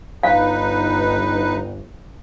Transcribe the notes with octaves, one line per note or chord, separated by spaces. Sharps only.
G1 D#4 B4 F5